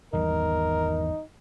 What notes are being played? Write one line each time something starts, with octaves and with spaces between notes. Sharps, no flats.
G#1 E2 G3 D#4 A#4